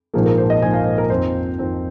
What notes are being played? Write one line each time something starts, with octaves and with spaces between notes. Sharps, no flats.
A#1 G#2 F3 A#3 G#4
A#4
C5
D#5
A#1 G#2 F3 A#3 G#5
F5
C5
A#4
F2 D#3 C4 C5
F2 D#3 C4